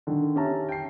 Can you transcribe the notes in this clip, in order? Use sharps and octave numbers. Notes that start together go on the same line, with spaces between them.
D3 D#3
C#4 G4 E5 A5 A#5
G5 A5 C7